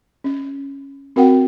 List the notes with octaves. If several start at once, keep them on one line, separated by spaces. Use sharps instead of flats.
C#4
C4 F#4 A#4 F#5 G5